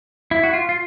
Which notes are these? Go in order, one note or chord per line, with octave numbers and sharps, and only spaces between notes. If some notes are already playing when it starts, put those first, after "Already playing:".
E4
F#4
F4
F4